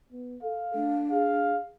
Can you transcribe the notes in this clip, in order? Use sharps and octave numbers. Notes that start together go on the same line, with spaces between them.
B3
A4 F5
A3 D4
G#4 F5